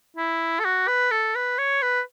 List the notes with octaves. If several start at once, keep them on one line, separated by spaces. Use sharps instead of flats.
E4
A4
F#4
B4
A4
B4
C#5
B4